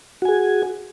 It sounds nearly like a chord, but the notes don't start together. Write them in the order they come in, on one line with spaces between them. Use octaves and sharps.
F#4 G#5 G#4